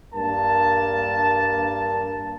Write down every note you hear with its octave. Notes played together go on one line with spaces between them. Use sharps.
G2 A#3 A#4 A5